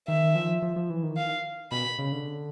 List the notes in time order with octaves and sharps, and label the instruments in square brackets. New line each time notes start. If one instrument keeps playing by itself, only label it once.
[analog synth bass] D#3 [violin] E5
[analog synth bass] F3
F3
F3
E3
D#3
[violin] F5
[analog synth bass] B2 [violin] B5
[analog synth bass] C#3
D3